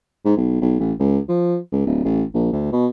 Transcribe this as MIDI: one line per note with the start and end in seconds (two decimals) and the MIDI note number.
0.25 0.34 44
0.37 0.60 35
0.61 0.77 35
0.80 0.93 33
0.99 1.19 37
1.28 1.57 53
1.72 1.82 37
1.86 2.00 26
2.04 2.23 33
2.34 2.50 34
2.52 2.68 38
2.72 2.87 47